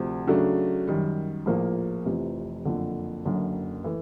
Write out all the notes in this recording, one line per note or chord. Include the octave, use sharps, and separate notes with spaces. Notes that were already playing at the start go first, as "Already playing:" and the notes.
Already playing: D2 C3 F3
C#3 F#3 A3 D4
F#2 D#3 G3
A#1 A2 F3 A#3
F1 F2 C3 E3
F#1 F2 D3
F#1 F#2 D3
E3 A3